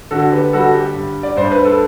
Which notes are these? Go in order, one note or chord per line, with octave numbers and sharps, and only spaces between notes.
D3 F#4 A4
G4 B4
G3 F#4 A4
G4
G2
D5
G2 C5
B4
A4